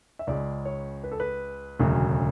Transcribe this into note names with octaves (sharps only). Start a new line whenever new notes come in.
E5
C#2 C#3 G#3 D5
C#5
B4
A4
B4
E1 D2 C#3 F#3 A3